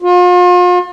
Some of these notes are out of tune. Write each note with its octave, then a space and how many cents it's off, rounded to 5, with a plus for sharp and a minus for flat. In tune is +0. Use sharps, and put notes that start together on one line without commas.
F4 +40